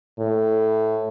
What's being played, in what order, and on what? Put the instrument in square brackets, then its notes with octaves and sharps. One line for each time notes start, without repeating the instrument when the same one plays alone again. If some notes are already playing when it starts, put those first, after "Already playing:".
[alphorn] A2